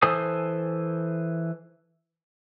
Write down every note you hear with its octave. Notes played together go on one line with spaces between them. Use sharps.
E3 A4 C5 G#5 D#6